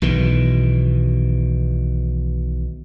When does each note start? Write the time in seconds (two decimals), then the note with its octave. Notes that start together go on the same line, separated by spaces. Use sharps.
0.02 B1 B2 D#3 E3